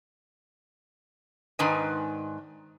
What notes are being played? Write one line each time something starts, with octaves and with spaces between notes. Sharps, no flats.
G#2 D#3 G#3 D4 B4 G#5